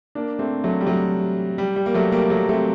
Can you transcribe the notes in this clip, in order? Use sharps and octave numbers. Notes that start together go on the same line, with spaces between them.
A#3 D4
A3 C4
F#3 A3
G3
F#3 A3
G3
G3
A#3
F#3 A3
G3 A#3
F#3 A3
A3 C4